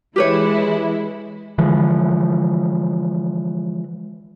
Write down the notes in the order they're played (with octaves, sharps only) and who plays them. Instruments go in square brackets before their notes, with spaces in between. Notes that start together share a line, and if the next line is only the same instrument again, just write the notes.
[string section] E3 G#3 E4 [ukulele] G4 B4 C#5
[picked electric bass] D3 E3 F3 G#3